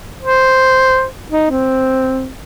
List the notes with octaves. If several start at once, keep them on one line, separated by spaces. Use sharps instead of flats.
C5
D#4
C4